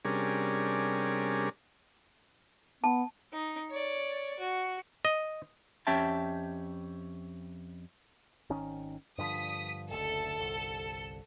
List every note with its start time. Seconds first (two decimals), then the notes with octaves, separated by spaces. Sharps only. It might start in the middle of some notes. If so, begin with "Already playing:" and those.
0.05 C3 G3 C#4 D4 G#4 A#4
2.84 B3 A5
3.33 D#4
3.70 C#5 D5
4.39 F#4
5.05 D#5
5.87 F2 C#4 G4 E5 G5 A5
8.50 G#1 D#3 C#4
9.18 G2 D3 F3 D#6 B6
9.90 F#1 D2 A4
10.36 G1 C2